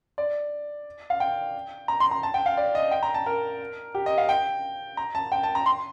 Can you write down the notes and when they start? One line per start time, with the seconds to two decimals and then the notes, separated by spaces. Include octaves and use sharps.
0.18 D5
1.10 F5
1.20 G5
1.88 A#5
2.00 C6
2.11 A#5
2.23 A5
2.34 G5
2.46 F5
2.57 D5
2.75 D#5
2.91 G5
3.03 A#5
3.14 A5
3.26 A#4
3.95 G4
4.06 D#5
4.18 F5
4.29 G5
4.97 A#5
5.15 A5
5.32 G5
5.43 A5
5.55 A#5
5.66 C6